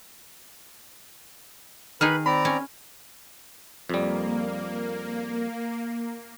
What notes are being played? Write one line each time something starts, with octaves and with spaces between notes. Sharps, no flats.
D#3 D#4 G#4 B4 B5 F6
C4 D5 A#5 B5
C#4
F2 G3 A#3